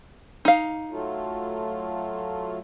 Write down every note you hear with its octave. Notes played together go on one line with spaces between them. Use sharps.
D#4 F5
F#3 A3 F4